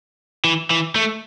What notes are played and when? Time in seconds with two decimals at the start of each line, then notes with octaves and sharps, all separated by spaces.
0.44 E3
0.70 E3
0.95 A3